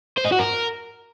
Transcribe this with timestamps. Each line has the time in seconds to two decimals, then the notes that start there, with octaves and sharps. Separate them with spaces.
0.17 C5
0.25 D#4
0.32 F#4
0.39 A#4